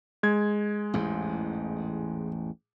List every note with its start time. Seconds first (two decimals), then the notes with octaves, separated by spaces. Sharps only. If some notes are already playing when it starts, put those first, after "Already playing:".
0.23 G#3 G#6
0.94 A1 E2 G#2